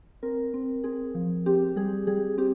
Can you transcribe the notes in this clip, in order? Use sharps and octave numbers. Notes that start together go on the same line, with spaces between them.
C4 A#4
C4
C4 G#4
F3
C4 G4
G3 G#4
G3 G#4
C4 G4